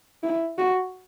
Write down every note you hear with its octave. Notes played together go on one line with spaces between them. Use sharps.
E4
F#4